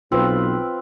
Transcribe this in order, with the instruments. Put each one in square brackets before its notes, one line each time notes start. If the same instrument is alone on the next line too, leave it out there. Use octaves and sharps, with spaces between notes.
[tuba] B1 [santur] C4 [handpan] F4 B4